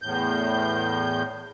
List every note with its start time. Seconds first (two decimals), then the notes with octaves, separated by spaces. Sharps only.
0.02 E2 A2 G6